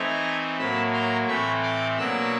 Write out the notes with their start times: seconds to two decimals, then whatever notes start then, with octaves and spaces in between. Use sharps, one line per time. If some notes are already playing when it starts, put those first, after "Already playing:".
Already playing: E3 A3 C4 D#4 G#5 A#5
0.58 A2 F#3 A#3 A5 B5
0.93 A#5 C6
1.28 A2 E3 A3 C4 B5 C#6
1.63 C6 D6
1.98 B2 F#3 A#3 D4 E6 F#6